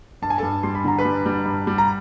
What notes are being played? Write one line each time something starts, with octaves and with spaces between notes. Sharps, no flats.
G2 A5
G#5
G2 A4 A5
G3 C6
B5
D3 A#5
B4 B5
G3
G3
G2
G3
A#5